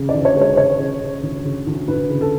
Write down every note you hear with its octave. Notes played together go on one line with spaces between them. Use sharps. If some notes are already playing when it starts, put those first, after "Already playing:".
Already playing: C#3
D5
D2
C#5
G#3
C#5
C#3 C#5
C#3
C#3
D2
C#3
D2
D2 B4
C#3
A4